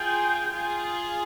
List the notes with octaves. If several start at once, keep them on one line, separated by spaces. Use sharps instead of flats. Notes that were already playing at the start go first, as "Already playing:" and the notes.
Already playing: F4 G#4 G5
F4 G#4